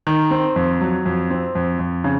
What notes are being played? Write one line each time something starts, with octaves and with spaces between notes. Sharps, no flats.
D#3
C4
F2
F#3
F2
C4
F2
F2
C#3